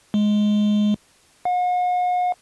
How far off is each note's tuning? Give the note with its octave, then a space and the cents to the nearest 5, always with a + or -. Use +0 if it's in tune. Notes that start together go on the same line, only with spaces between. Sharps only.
G#3 +10
F#5 -45